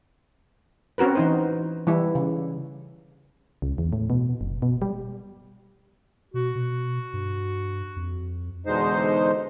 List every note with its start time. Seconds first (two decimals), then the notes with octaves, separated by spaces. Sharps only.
0.98 C4 C#4 F#4 A#4 B4
1.15 E3 D#4 C5
1.87 E3 G3 E4
2.15 C#3
3.62 C#2
3.78 E2
3.93 A2
4.10 B2
4.41 F#1
4.62 B2
4.82 G3
6.34 B2 F#4
6.55 B2
7.13 G2
7.96 F2
8.66 E2 B2 D3 G#3 D#4 C5